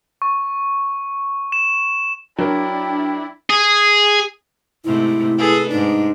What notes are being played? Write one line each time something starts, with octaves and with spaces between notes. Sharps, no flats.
C#6
E7
F#3 D4 E4 A#4 G5
G#4
G#2 C3 A3 E4
G#4 A4 B4
G#2 D4 D#4